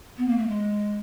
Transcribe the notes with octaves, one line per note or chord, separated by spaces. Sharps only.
B3
A#3
A3
G#3